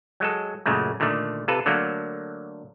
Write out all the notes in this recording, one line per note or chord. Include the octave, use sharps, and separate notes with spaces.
F#3 G#3 A4
F#2 A#2 C#3 G#3 A3
A#2 D3 D#3 A3
C3 F4 A4 B4
D3 F#3 A3 A#3